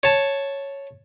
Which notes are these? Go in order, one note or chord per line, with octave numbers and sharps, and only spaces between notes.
C#5 A5